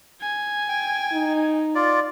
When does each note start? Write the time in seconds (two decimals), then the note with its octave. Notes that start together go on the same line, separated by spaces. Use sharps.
0.22 G#5
0.69 G5
1.12 D#4
1.75 F4 D5